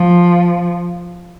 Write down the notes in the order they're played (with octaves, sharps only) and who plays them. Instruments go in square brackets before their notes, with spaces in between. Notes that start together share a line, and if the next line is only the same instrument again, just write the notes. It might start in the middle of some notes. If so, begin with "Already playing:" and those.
Already playing: [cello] F3